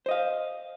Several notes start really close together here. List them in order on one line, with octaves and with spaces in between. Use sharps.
C5 D#5 F5